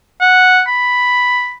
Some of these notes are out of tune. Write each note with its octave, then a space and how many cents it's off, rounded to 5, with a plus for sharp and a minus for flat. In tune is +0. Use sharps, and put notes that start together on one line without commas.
F#5 -5
B5 +0